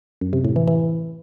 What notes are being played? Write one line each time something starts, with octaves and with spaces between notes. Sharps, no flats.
F#2
C3
A2
E3
E3